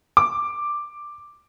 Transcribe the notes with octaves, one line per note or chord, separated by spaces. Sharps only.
D6